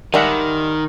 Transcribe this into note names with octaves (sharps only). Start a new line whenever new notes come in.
D#3 G3 G#3 A#4 E5 F#5